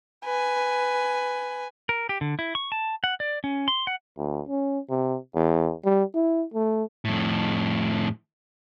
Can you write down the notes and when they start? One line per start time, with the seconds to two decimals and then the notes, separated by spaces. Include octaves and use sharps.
0.25 B4 G#5
1.89 A#4
2.09 G4
2.21 D3
2.39 E4
2.55 C#6
2.72 A5
3.04 F#5
3.20 D5
3.44 C#4
3.68 C6
3.87 F#5
4.18 D2
4.49 C#4
4.90 C3
5.35 E2
5.85 G3
6.15 E4
6.54 A3
7.05 F2 A2